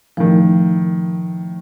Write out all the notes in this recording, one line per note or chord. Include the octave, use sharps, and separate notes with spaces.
A2 D#3 F3